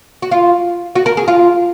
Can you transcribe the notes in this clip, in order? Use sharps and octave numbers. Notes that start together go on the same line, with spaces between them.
F#4
F4
F#4
A#4
G#4
F4